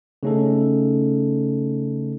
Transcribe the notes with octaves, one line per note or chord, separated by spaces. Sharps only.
C#3 A3 C#4 D#4 A4